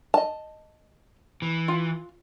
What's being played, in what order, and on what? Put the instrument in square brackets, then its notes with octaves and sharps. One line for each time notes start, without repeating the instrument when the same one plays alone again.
[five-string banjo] D#5 A5
[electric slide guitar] E3
[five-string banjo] F4